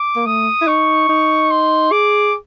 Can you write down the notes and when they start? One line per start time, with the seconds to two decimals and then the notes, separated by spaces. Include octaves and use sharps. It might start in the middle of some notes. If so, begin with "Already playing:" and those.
Already playing: D6
0.16 A#3
0.26 A3 D#6
0.61 E4
0.67 D#4 C#6
1.09 D#4
1.51 C6
1.92 G#4 D6